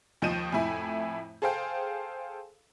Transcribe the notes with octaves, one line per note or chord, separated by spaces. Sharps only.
D#2 F3 D#5 G6 D#7 E7
F2 A2 E4 G#5
G#4 A4 C5 F5 G5